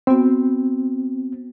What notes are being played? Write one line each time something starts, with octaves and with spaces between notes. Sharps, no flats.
B3 C4 F#4